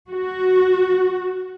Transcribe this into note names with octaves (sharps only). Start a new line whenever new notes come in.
F#4